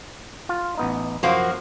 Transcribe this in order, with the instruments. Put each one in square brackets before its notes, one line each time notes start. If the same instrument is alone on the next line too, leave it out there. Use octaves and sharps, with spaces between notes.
[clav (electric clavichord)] F4
A1 B3 D#4
[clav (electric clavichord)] F#2 [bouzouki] F3 A#3 F#4